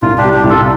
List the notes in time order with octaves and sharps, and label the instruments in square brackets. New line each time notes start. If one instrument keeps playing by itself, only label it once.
[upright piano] C2 [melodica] F4
[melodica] D4 G4
[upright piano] G3
[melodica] D4 G4
[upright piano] C2
[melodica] F4 A4